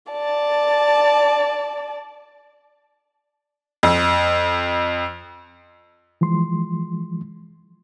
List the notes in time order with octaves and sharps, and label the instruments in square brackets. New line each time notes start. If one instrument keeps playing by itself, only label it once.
[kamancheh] D5 A5
[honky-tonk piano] F2
[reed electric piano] E3 F3 G#3 C6